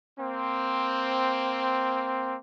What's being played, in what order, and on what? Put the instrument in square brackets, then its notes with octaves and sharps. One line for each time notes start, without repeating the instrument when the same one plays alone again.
[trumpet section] A#3 C4